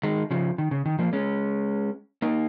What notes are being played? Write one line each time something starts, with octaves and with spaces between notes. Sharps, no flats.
D#3 G#3
C#3 F3
D#3
C#3
D#3
F3 A#3
G#3 C#4
A#3 D#4